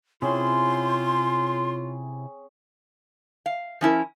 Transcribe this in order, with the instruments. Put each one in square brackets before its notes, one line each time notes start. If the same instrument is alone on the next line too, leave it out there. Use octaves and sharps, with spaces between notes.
[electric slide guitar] C3 E4 [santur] C4 C#4 G#4 [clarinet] F4 [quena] C6
[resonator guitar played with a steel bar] F5
F3 C#4 E4 A#4